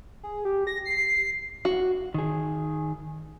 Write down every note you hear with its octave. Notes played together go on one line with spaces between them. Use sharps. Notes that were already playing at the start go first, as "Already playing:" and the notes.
G#4
G4
A#6
C7
F#4
D#3 G#4